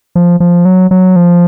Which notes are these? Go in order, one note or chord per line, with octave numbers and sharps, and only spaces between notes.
F3
F3
F#3
F#3
F3